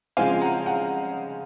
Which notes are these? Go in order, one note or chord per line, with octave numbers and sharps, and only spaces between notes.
C#3 F3 G#3 C4 F5 G#5
F#5 A#5
F#5 A#5